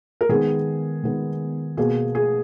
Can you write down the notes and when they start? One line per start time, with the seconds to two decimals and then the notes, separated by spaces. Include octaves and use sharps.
0.21 A#4
0.29 D#3 G#3 B3 G#4
1.03 D#3 G#3 B3
1.77 B2 A#3 G#4
2.15 G#4